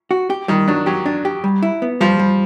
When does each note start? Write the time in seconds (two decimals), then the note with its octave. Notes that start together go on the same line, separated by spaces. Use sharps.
0.11 F#4
0.30 G4
0.48 D#3 G3
0.68 F#3 D4
0.86 F#3 G4
1.06 D4
1.25 G4
1.44 G3
1.63 E4
1.82 B3
2.01 F3 G3
2.19 G3